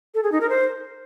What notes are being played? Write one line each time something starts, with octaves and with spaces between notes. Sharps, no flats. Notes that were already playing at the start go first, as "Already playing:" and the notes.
A4
G#4
D#4
A#4
C5